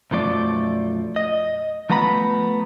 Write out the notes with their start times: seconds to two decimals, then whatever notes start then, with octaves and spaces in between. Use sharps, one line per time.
0.11 B1 F#2 F3 A3 D5
1.16 D#5
1.90 F3 A3 B3 A#5 B5